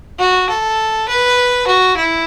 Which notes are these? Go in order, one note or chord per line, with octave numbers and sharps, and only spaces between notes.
F#4
A4
B4
F#4
E4